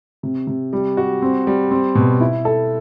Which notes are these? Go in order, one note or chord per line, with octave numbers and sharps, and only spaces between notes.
C3
C3
G3
F#4
C4
G3
C4
B2
E4
A4